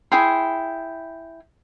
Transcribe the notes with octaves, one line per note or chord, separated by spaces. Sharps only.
E4 G#4 G5 C6